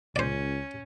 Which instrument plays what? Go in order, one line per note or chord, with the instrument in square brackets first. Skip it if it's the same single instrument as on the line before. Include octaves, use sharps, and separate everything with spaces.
[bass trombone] C#2 [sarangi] C#4 [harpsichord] C5 D5